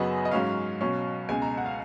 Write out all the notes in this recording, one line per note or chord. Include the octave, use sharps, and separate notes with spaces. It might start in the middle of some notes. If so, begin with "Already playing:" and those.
Already playing: F#2 C#3 F#3 B3 D#5
D#5
G#2 F#3 C#4 F5
B2 F#3 C#4
C#2 B2 G#3 G#5
A#5
F#5
F5